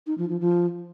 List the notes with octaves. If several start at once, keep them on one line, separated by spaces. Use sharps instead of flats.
D#4
F3
F3
F3